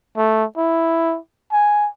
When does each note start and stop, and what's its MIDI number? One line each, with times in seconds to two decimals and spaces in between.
0.17 0.44 57
0.57 1.18 64
1.52 1.88 80